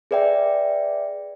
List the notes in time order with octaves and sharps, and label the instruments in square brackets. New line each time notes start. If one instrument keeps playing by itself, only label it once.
[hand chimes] G#4 B4 D5 E5 G5